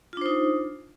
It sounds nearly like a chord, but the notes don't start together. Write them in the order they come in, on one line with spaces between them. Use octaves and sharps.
F4 D4 C5 D#4